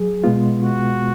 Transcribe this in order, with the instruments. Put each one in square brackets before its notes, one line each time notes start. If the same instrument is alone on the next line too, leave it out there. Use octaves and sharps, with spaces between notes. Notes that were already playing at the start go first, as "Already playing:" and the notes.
Already playing: [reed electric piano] F#3 G#4
B2 G#3 B3 F4
[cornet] F#4